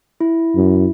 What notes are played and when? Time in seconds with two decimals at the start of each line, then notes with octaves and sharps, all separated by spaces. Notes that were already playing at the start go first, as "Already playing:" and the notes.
0.20 E4
0.55 F#2